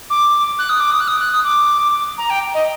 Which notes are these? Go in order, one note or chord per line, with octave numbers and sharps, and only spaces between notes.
D6
F#6
D#6
D6
D#6
F#6
D#6
F#6
D#6
D6
A#5
G5
D#5